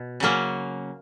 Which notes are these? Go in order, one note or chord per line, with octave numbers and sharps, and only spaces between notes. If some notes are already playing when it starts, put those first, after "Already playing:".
Already playing: B2
C#3 F#3 A#3 C#4